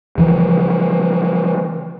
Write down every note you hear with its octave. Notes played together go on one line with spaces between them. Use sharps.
C#3 E3 F3